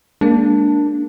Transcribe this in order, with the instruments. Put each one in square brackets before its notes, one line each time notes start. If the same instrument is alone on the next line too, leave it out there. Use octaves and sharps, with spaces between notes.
[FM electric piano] G#3 A#3 [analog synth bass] D4